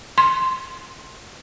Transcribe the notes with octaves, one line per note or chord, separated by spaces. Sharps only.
C6